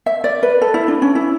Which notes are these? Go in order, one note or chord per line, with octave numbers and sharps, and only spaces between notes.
E5
D5
B4
A4
E4
D4
C#4
E4